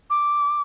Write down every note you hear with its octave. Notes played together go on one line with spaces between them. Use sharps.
D6